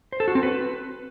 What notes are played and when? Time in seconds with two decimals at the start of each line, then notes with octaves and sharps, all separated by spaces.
0.12 C5
0.20 A4
0.28 F#4
0.35 C4
0.43 B4